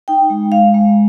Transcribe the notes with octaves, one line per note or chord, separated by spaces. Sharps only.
D#4 G5
G#3
G#3 F5
G#3